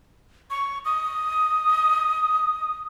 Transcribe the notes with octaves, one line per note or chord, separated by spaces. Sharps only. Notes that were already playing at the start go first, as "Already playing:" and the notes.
C#6
D#6